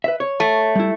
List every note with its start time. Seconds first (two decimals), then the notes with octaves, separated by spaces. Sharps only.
0.04 B4 E5
0.20 C#5
0.40 A3
0.75 G3 E4